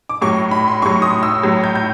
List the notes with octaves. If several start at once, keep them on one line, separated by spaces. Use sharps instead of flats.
D6
A2 F#3 C#6
B5
C6
A2 F#3 C#6
D#6
E6
A2 F#3
G6
G6